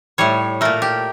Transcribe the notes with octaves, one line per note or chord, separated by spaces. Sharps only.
A2 G3 C#5
A#2 A3 A#4
G4